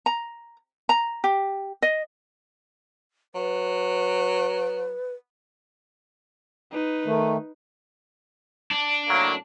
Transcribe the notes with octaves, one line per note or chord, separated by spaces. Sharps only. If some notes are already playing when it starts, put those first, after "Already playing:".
A#5
A#5
G4
D#5
F#3 B4
D#4 B4
D#3 A3
D4
A2 F#3 A#3